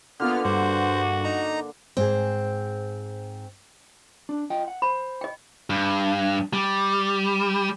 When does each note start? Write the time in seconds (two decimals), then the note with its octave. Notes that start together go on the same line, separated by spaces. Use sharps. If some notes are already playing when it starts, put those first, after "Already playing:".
0.20 D3 A#3 B3 F4 F6
0.45 G2 F#4 C5
1.24 D#4 A#5
1.97 G#2 C4 G#4
4.29 D4
4.50 F4 D#5 G5
4.68 F#5
4.82 C5 B5
5.21 D#5 G5
5.70 G2
6.53 G3